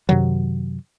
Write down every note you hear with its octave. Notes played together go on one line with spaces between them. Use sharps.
F#2 C3 D#3 F#3